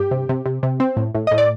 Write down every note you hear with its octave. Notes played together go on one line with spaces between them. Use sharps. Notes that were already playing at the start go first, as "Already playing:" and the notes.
Already playing: G2 G4
C3
C3
C3
C3
C4
A2
A2
A2 D#5
D5